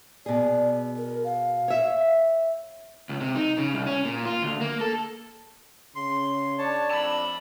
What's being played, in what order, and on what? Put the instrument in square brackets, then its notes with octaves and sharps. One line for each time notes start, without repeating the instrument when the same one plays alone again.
[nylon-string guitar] B2 G#4 [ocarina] D5
[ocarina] A#4
F5
[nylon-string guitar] C#5 E5
[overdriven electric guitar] C#2
C3
D#4
C#3
C2
C#4
A#2
F4
D2
A#3
A4
[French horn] C#3 [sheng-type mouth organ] C6
[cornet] D4 [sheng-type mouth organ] C#5 A5
[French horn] F2 [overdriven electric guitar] A5 B5 [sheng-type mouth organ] E6